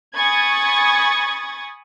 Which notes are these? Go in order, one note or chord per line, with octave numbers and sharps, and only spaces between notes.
G#5 B5 C#6 D#6 G#6 A6